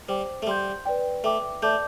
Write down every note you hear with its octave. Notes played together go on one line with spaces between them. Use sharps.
G3 C5 G5 D6
A3
G3 F#5 C6 G6
B4 D5 G5
A3 E5 G5 D6
A3 D5 A5 D6 G6